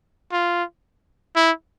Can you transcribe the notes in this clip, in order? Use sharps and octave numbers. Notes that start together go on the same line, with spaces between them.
F4
E4